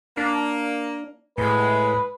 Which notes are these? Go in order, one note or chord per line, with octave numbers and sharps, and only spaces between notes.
A#3 D4
A2 G#3 B4